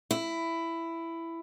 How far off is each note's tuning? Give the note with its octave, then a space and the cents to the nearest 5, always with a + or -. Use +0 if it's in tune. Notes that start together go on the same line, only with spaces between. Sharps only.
E4 +10